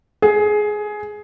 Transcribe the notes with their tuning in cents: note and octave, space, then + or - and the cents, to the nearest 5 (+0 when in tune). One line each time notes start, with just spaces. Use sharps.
G#4 +15